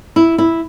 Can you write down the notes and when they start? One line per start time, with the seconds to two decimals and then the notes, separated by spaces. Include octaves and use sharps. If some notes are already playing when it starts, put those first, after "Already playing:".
0.16 E4
0.38 E4